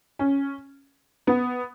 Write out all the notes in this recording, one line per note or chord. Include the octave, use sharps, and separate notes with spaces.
C#4
B3